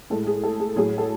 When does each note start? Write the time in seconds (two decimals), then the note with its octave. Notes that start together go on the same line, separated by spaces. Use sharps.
0.10 A2 G#3 A4
0.27 G#4
0.43 A4
0.59 G#4
0.76 A2 F#3 G#4
0.98 A4